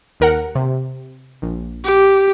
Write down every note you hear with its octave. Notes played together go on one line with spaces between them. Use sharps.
D#2 A#4 F#5
C3
A#1
G4